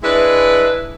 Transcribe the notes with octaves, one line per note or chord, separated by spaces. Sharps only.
G#3 D4 E4 B4